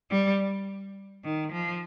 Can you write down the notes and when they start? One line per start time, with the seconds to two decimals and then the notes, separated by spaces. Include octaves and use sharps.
0.11 G3
1.24 D#3
1.52 F3